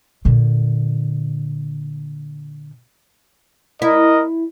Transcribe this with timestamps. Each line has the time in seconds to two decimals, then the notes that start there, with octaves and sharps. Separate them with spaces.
0.25 A#2 D3
3.82 E4 A#4 D#5